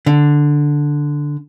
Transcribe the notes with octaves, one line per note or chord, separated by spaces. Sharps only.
D3